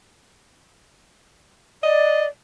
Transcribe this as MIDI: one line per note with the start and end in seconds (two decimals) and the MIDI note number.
1.83 2.27 74
1.83 2.25 75